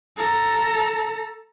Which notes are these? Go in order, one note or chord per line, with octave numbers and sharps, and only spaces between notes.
A4 A#5